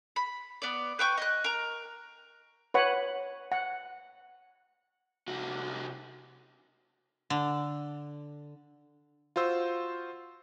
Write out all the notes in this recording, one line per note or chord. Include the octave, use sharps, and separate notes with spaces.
B5
B3 D5
B4 G5 C#6 G6
D#5 F#6
A#4 A#5
B4 C#5 F#5
F#5
C2 F#4
D3
F4 F#4 C5 E6